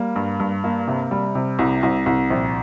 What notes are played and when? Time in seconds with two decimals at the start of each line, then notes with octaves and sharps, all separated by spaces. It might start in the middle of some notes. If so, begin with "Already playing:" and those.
Already playing: G3 A#3
0.16 G2
0.40 G2
0.64 A#3
0.88 C3
1.11 G3
1.35 C3
1.59 C2
1.83 C2
2.06 C2
2.31 A#1